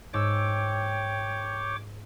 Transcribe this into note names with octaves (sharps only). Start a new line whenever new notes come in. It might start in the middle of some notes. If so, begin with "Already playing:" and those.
G#2 C#5 G5 D6 E6